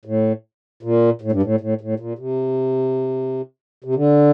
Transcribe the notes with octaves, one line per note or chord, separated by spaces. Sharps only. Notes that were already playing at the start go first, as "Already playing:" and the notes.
A2
A#2
A2
G2
A2
A2
A2
A#2
C3
C3
D3